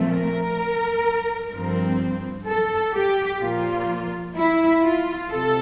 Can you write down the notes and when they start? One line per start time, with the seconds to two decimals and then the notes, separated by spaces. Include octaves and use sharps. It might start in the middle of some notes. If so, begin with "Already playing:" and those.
Already playing: A#2 F3 A3 C4
0.08 A#4
1.52 G2 F3 C4
2.46 A4
2.94 G4
3.41 A#2 F3 A#3 F4
4.36 E4
4.83 F4
5.30 C3 A4